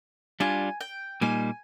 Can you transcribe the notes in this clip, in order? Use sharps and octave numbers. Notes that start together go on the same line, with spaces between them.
G3 D4 F4 G#5
G5
A#2 G3 A#3 D#4 G#5